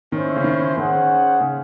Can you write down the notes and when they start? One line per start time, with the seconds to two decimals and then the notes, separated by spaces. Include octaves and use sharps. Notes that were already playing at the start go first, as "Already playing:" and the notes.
0.12 D#3 C#4 E4 C5
0.36 C#3
0.44 D#3
0.77 D#3 C#4 G#4 C5 F#5
1.41 C#3